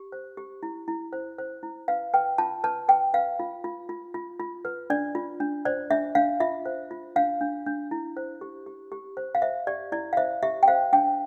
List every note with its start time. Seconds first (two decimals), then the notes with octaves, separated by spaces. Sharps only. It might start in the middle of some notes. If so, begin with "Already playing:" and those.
Already playing: G4
0.12 C5
0.37 G4
0.63 E4
0.88 E4
1.13 C5
1.38 C5
1.63 E4
1.88 B4 F5
2.14 B4 G5
2.38 F4 A5
2.64 B4 A5
2.88 B4 G5
3.14 B4 F5
3.39 F4
3.64 F4
3.89 F4
4.14 F4
4.40 F4
4.65 B4
4.90 D4 D5
5.15 F4
5.40 D4
5.65 C5 D5
5.91 D4 E5
6.15 D4 F5
6.40 F4 E5
6.66 C5
6.91 F4
7.16 D4 F5
7.41 D4
7.66 D4
7.91 E4
8.17 C5
8.41 G4
8.66 G4
8.92 G4
9.17 C5
9.35 F5
9.42 C5 E5
9.67 G4 D5
9.92 E4 D5
10.13 F5
10.17 C5 E5
10.43 G4 E5
10.63 G5
10.68 C5 F5
10.93 D4 G5